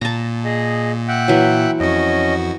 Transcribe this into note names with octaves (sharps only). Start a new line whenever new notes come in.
A#2 A5 A#5
G#4 D#5
E5 F#5 G5
E3 F#3
F2 C#4 F#4 D#5